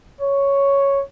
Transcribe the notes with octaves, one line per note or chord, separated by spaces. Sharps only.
C#5